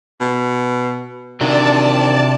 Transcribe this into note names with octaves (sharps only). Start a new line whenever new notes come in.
B2
C3 D#3 E3 F#3 D4 D5 A5